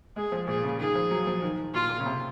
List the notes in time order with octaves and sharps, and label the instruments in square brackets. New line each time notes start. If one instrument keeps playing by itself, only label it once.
[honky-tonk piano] G#3 [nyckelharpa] G#4
[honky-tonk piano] F3
[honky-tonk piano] A#2 [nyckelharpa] G#4
[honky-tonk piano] C#3
[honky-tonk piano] D#3 [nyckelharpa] G#4
[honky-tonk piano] F3
F#3
F3
D#3
[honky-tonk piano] A#2 [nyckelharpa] F4
[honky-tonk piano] A#2
C#3
C3